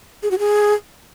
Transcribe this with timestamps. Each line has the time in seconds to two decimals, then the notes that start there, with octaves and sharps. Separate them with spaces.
0.23 G#4
0.31 F#4
0.39 G#4